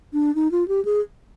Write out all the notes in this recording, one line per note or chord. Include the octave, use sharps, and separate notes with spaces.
D4
D#4
F4
G4
G#4